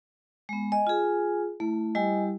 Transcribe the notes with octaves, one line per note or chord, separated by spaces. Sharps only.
G#3 B3
D#5 G#5
F4 G#4
A3 E4
G3 E4 G4 D#5 G#5